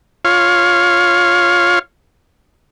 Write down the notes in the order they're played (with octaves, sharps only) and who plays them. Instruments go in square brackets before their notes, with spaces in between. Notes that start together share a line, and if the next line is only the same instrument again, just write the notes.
[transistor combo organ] F4 C#5 F5